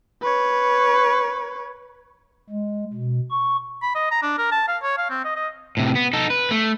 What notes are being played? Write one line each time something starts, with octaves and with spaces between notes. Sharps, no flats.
B4 C#5
G#3
B2
C#6
B5
D#5
A#5
D4
A#4
A5
F5
C#5
F5
C4
D#5
D#5
A2 C3
B3
D#4 A4
B4
A3